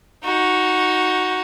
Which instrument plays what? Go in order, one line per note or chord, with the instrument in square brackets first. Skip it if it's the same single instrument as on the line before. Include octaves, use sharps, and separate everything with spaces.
[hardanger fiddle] D#4 F#4